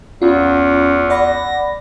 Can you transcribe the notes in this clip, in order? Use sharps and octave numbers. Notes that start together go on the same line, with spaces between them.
E2 C#4 F4
D5 F#5 B5 A#6